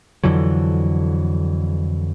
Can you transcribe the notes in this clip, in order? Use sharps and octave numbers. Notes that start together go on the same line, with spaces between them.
F2 D3 E3 F#3